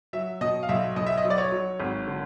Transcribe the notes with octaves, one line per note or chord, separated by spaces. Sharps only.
F#3 E5
B2 D#5
F5
B1 E5
B1 D#5
E5
D#5
F#3
D5
C#5
F#3
G#1
D3